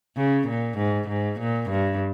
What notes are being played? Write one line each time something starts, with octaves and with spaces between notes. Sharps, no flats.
C#3
A#2
G#2
G#2
A#2
G2